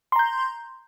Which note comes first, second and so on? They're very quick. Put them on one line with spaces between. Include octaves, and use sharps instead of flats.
C6 A#5 G6